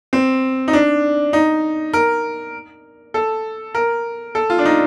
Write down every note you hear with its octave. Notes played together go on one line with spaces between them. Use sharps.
C4
D#4
D4
D#4
A#4
A4
A#4
A4
F4
D4
D#4